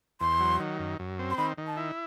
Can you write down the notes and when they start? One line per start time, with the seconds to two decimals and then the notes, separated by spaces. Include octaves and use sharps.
0.20 E2 C6
0.40 F#3
0.60 D#3
0.79 F#2
0.99 F#2
1.19 C4
1.31 C6
1.38 D#3 B5
1.58 D#3
1.67 A5
1.77 E4